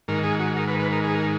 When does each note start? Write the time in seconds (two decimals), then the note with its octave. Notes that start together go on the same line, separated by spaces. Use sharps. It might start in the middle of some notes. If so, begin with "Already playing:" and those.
0.08 G#2 D#3 A#4
0.24 G#4
0.39 F#4
0.57 A#4
0.68 B4
0.79 B4
0.92 A#4
1.04 G#4
1.15 A#4